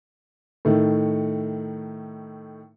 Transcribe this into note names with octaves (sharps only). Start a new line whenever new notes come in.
A2 D#3 A3